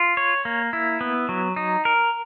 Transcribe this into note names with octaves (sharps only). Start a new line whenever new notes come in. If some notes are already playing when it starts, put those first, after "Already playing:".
Already playing: F4
C#5
A#3
E4
B3
F#3
D#4
A#4